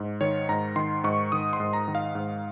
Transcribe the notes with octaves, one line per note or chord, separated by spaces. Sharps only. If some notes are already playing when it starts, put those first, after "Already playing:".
Already playing: G#2
D#3 C#5
G#2 A#5
D#3 C6
G#2 C#6
D#3 D#6
C6
G#2
A#5
D#3
F5
G#2